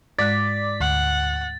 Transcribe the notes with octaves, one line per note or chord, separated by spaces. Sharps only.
G#2 G#3 D5 D6 F#6 A6 B6
D2 F#5